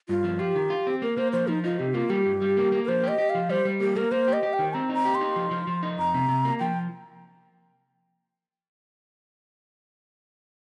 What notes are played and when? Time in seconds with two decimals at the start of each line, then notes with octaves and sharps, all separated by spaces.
0.09 G2 F4
0.24 F3
0.39 F4 G4
0.55 D#3
0.70 F4
0.87 C4
1.02 A#3 A#4
1.18 A#3 C5
1.32 F3 C5
1.48 F3 D#4
1.64 D#4 F4
1.79 C3 G4
1.94 A#3 F4
2.10 G3 G4
2.26 G2
2.42 G3
2.57 A#3
2.72 A#3
2.84 A#4
2.88 F3 C5
3.04 G4 D#5
3.18 G4
3.30 F3 F5
3.49 G3 C5
3.65 G3
3.80 A#3 G4
3.96 A#3 A#4
4.12 A#3 C5
4.28 G4
4.33 D#5
4.43 G4
4.53 G5
4.59 D#3
4.73 C4 A#5
4.89 D#4 A#5
5.05 G4
5.15 C6
5.21 D#4
5.36 F3
5.51 F3
5.67 F3
5.83 D#4
5.98 F2 A#5
6.14 C3
6.29 C3
6.45 A#3
6.60 F3 G5